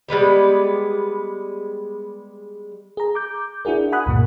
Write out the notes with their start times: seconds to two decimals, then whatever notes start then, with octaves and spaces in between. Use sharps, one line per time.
0.08 G3 G#3 B3 G4
2.97 G#4 A#5
3.15 D6 G6
3.65 D4 E4 F#4 G#4 A#4
3.92 F#5 G#5 B5 D#6 F#6
4.06 C#2 G2 A#2 A#3